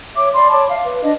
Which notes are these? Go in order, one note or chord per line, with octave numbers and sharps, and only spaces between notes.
C#5 E5 D6
D5 B5 C6
C#5 A5 B5 D6
E5 F5
B4
D4 D#5